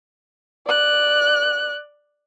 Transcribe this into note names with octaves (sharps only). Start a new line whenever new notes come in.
D5 F#6